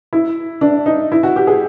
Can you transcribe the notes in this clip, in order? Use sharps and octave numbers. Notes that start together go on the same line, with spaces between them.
E4
D4
D#4
E4
F#4
G4
G#4